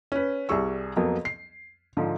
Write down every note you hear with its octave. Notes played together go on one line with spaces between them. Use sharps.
C#4 B4
C2 G3 G#4 C#6 E6
F2 F#3 A#3 B3
C7
G#2 D3 F3